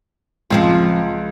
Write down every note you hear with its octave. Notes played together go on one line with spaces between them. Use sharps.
C#2 F3 C4 F4